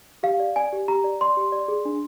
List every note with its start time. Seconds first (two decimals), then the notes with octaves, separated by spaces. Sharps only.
0.23 G4 F5
0.40 D5
0.56 D5 G#5
0.73 G4
0.88 G4 A#5
1.04 D5
1.21 D5 C6
1.37 G4
1.52 D5
1.68 G#4
1.85 D4